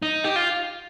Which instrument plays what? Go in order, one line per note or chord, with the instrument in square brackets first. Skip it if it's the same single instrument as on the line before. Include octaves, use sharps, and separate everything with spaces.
[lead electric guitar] D#4
G4
F4